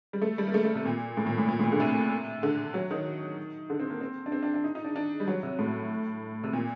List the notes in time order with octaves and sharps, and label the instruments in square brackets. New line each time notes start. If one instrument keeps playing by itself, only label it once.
[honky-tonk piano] G3
A3
G3
A#3
A3
A3
C3
A#2
A2
A#2
A2
A#2
A2
A#2
D3
C3
D3
F#3
D#3
D3
C4
A#3
C4
D4
C4
D4
D4
D#4
D#4
D4
D4
G3
F#3
C3
A2
C3
A#2